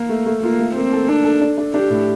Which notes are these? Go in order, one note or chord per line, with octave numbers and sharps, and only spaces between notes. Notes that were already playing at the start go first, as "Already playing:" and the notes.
Already playing: A#3
A3
A3
A#3 F4
A3
A#3 C4
A4
D4 A4
A4
D4
D4
D4 G4
A2